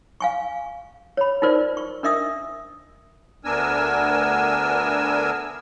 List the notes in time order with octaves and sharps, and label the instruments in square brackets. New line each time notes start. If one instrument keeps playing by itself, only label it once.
[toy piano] F5 G#5 C#6
C#5 B5
D#4 F4 A#4 C5 D5
C#6
D4 A#4 D#5 E5 D#6 E6
[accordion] D2 B3 D4 A#4 G#5 E6